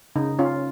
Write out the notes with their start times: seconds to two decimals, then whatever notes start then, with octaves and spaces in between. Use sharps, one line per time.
0.16 C#3 D#4
0.39 C#4 F4